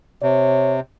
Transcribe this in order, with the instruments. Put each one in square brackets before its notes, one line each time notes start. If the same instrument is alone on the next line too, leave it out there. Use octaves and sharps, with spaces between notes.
[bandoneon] C3 [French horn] C#5